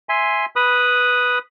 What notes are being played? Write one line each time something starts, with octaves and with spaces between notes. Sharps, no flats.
E5 G#5 C6
B4 B5 D#6